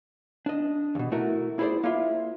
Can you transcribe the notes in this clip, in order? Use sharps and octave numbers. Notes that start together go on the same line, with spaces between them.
D4 D#5
D#2 B2
A3 E4 F#4 A#4
E4 G#4 A4 C5 D5
A#3 E4 F4 E5